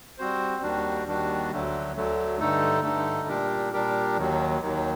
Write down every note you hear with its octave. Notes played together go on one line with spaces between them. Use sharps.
G3 C4 F#4 C5
D#2 D#3 G3 D4 F#4
D#2 D#3 G3 D4 F#4
D2 D3 F#3 A3
D2 D3 F#3 A3
G2 D3 A3 D#4 A4
G2 D3 A3 D#4 A4
A#2 G3 D4 G4 A#4
A#2 G3 D4 G4 A#4
D#2 D#3 F#3
D#2 D#3 F#3